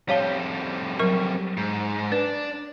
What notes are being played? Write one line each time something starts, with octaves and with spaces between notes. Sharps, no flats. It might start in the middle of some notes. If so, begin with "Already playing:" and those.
F2 G3 C#5 F5 A5
F#3 A#4 C#6
G#2
D4 B4